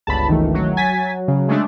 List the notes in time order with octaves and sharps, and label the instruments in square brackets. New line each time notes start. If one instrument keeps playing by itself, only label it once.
[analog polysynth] G1 C#2 [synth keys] A5 B5
[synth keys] D#3 E3 A3
[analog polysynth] F#3
[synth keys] G#5 A6 B6
C#3
[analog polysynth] G#3 A3 D4